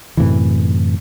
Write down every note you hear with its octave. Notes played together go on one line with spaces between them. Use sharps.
F#2 A2 C3 E3